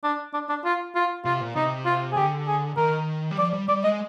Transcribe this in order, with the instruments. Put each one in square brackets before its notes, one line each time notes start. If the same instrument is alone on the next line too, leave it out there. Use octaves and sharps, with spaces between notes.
[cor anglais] D4
D4
D4
F4
F4
[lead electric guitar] C3 [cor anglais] F4
[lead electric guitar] A#2
[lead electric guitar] C3 [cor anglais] D#4
[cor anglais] F4
G#4
[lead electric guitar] D3 [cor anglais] G4
[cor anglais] G#4
[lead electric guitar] D#3 [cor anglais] A#4
[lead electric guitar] G3
[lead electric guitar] F3 [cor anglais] D5
[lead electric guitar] G3
[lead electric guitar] G3 [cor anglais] D5
[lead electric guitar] G#3 [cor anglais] D#5